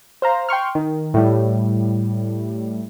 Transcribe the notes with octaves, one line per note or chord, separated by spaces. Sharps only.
C5 F5 A#5
G5 C6 C#6 F6
D#3
A2 G3